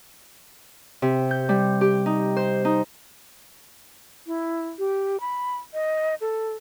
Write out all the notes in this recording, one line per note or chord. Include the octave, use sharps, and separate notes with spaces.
C3
G6
G3
G4
D#4
C5
D#4
E4
G4
B5
D#5
A4